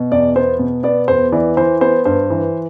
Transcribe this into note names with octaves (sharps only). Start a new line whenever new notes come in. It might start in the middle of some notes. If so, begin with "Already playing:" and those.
Already playing: B2
E2 D5
B3 C5
B2
B3 D5
E2 C5
E3 D5
E3 C5
B3 C5
G2 C5
E3